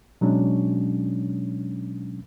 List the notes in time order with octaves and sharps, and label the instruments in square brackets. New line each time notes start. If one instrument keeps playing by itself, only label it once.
[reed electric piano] B2 F#3 G#3 C#4 D4